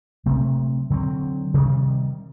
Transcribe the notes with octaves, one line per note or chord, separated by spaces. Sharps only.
C3 F#3 A3 C4
D3 F#3 A3 C4
C3 D#3 G3